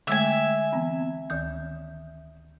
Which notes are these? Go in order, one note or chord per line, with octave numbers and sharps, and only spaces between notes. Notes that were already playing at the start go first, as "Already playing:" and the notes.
D3 G#3 A3 E5 G#5
E3 B3 C4
D2 D#3 G6